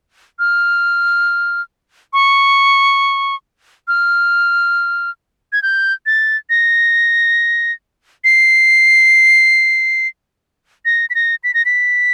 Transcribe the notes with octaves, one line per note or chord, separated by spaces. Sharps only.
F6
C#6
F6
G#6
G6
A6
A#6
C7
A#6
B6
A#6
B6
A#6
B6